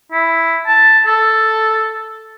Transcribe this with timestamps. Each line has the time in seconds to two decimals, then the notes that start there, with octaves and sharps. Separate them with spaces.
0.12 E4
0.67 A5
1.07 A4